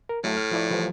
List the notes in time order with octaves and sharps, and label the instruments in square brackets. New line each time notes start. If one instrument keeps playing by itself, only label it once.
[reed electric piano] A#4
[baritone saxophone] A2 [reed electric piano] F#3 A3
[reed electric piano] F6
F3 E4 D5
E3 F3 G3